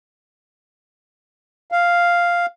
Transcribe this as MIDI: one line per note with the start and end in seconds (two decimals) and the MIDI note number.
1.72 2.46 77